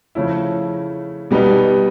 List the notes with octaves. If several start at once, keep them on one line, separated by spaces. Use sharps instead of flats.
C#3 F3 A3 C#4 E4
B2 G3 B3 D#4